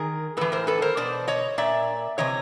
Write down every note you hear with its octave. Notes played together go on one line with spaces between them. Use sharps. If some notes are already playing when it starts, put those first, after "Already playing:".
Already playing: D#3 G#4 A#4
A2 E3 A4 B4
A#4 C5
A4 B4
A#4 C5
B2 C5 D5
C#5 D#5
A#2 D5 E5
C3 E3 C#5 D#5